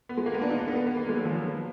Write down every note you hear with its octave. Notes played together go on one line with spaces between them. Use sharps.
B3
G#3
A#3
B3
D4
D#4
D4
B3
A#3
B3
A#3
G#3
F#3
F3
F#3
F3